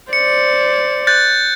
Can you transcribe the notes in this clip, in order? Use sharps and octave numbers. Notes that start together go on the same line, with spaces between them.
C5 D5 C#7
F#6 G6 A6